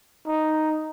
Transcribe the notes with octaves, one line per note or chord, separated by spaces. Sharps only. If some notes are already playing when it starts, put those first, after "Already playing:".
D#4